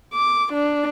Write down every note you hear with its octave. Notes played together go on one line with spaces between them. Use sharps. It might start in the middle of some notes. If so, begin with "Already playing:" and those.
D6
D4